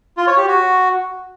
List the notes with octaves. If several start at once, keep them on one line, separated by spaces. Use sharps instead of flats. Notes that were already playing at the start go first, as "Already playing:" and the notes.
F4
C#5
G4
F#4